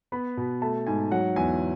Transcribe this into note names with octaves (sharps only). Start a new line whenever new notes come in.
B3 B5
B2
A3 A5
G#2 G#5
F#3 F#5
E2 G#5